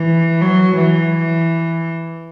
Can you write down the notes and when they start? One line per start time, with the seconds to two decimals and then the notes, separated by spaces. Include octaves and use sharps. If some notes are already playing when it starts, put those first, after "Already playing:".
Already playing: E3
0.41 F#3
0.76 E3